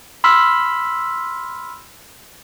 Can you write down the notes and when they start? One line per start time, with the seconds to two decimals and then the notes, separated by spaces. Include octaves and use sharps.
0.24 B5 C6 E6 F6 B6